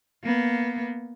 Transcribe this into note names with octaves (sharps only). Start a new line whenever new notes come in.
A#3 B3